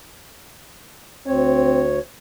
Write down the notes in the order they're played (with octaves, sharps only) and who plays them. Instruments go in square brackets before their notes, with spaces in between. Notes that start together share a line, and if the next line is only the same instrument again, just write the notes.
[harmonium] D2 C#5 [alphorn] C4